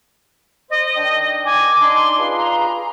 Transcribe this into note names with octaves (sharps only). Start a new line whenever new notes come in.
C5 D#5
D#3 D4 G5
G#5 D6
D4 D#4 A5 C6
F4 G#4 B4
A#5